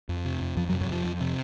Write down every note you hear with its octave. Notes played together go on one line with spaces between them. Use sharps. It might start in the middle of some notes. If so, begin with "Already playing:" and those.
F2
C3
F2
F2 F3
F#2 F#3
C3
F#2 F#3
F2 F3
F2
C3